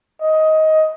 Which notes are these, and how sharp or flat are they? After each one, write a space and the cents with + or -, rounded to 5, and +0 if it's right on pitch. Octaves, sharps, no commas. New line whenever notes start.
D#5 +15